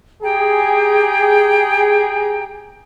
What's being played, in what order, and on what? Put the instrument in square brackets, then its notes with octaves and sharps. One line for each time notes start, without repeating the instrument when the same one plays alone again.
[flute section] G4 G5 A#5 [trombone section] G#4